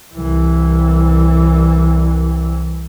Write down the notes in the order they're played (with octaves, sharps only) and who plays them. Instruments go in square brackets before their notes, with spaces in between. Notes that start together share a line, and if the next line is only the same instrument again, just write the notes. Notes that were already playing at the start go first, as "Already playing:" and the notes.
[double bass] C2 E3